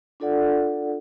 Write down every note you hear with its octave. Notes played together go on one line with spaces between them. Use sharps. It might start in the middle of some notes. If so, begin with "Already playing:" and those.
D4 F4 A4 D5 F#5